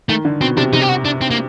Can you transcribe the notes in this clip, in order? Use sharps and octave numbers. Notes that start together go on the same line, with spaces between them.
D#3 A3
D3
B2 C4
C3 D4
C3 D#4
G4
F#4
D4
C4
A#3